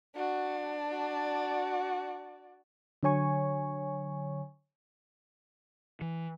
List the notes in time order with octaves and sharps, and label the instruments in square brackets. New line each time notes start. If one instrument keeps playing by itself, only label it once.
[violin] D4 [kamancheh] F#4
[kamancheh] F#4 D5
[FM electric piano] D3 F#3 C#5 G#5 C#6
[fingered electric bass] E3